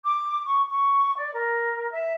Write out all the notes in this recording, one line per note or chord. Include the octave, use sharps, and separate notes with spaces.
D6
C#6
C#6
D5
A#4
E5